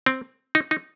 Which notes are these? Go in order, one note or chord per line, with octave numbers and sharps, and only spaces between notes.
C4
D#4
D#4